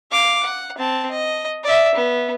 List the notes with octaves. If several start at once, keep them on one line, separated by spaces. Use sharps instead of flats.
F5 D6
F#5
C4 A5
D#5
D5 E5
B3